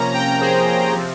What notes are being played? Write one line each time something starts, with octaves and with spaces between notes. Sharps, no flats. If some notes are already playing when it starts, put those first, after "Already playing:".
Already playing: C3 F3 A#3 C#4 A#5
G5 A#5
G#4 C5
C3 F3 C4